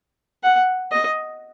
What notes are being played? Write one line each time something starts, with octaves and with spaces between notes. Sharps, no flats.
F#5
D#5